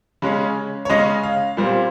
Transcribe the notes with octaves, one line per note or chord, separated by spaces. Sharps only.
C#3 G#3 C#4
C#5
C#3 G#3 C#4 D#5
F5
A#2 G3 C4